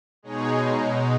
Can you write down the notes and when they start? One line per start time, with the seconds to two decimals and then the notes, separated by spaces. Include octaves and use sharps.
0.23 B2 G#3 D#4 G#4 C#5
0.59 B2 G#3 D#4